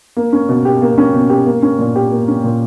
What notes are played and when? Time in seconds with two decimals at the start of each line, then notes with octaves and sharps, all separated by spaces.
0.16 A#3
0.33 C#4
0.49 B2
0.65 G4
0.82 A#3
0.98 C#4
1.14 B2
1.30 G4
1.46 A#3
1.62 C#4
1.79 A#2
1.95 G4
2.11 A#3
2.28 C#4
2.44 A#2